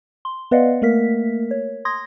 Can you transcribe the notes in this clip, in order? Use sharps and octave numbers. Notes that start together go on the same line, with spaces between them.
C6
B3 B4 D5 D#5 F5 F#5
A3 A#3 A#4 B6
C#5
C6 D#6 G#6 A#6